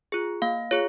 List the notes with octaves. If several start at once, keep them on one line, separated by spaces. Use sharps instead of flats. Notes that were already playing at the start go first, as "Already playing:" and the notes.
F4 G#4
A#3 F5
F4 G#4 C#5